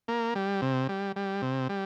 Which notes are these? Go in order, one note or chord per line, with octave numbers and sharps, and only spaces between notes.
A#3
G3
C3
G3
G3
C3
G3